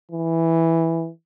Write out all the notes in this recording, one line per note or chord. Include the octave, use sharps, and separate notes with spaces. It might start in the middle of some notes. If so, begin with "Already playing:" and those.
E3